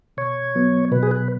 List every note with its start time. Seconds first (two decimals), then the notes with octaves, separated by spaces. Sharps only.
0.17 B2 C#5
0.55 F#3 B3
0.91 B2 B4
1.03 G#4
1.11 B4